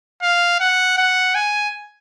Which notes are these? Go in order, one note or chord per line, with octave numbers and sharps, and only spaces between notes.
F5
F#5
F#5
G#5